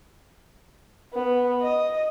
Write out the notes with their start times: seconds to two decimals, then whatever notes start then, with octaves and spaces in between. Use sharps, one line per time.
1.14 B3
1.61 D#5